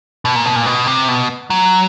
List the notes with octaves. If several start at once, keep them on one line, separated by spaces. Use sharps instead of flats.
B2
A#2
B2
A#2
B2
C3
B2
F#3